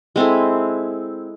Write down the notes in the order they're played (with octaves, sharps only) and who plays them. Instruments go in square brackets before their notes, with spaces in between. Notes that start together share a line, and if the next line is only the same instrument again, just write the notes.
[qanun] G#3 C4 E4 A4